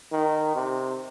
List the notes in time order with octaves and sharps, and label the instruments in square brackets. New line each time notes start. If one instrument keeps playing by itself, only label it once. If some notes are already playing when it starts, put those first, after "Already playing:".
[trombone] D#3
C3